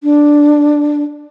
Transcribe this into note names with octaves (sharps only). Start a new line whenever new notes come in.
D4